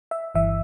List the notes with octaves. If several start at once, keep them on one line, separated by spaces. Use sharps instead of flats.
E5
G1 G2 E3 E5